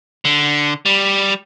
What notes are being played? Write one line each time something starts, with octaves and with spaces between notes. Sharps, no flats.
D3
G3